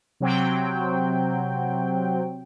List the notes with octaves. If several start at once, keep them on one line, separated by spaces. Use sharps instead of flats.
C3 F#3 C4 G5